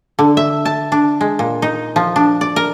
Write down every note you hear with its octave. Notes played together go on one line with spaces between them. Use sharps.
D3
E5
A5
D4
G#3
A#2
D#4
F3
D4
D5
A#4